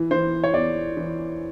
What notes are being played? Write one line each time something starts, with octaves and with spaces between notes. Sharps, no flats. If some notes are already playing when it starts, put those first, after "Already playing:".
Already playing: E3
E3 C5
C#5
E2 D5
E3